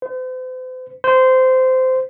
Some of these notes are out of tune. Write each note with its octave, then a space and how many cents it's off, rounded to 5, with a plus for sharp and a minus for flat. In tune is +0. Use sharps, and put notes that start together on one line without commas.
C5 -40
C5 -15